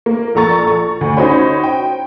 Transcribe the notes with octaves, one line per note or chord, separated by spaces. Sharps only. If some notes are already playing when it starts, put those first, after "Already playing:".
A#3
A#1 A4 A#5 C#6 A6
C#6
D2
C#4 D#4 F#4 C5 C#5 B5
G5